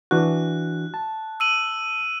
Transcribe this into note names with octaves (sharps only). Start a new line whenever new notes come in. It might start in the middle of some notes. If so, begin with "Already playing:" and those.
E3 D4 F#4 F#6
A5
E6 D#7 F#7